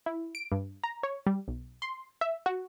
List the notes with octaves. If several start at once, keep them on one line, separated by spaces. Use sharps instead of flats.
E4
D7
G2
A#5
C#5
G3
B1
C6
E5
F#4